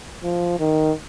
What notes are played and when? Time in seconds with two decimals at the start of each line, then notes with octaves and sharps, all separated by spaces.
0.23 F3
0.59 D#3